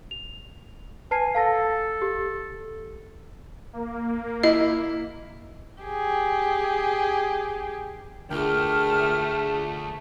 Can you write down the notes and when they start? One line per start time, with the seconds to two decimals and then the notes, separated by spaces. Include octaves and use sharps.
0.11 F7
1.11 B4 G#5 A5 C7
1.35 A4 F5 A5 A#6
2.02 G4
3.73 A#3
4.43 E4 D#5
5.83 G4 G#4
8.31 D2 A3 D4 F4 G#4 A#4 G5 F6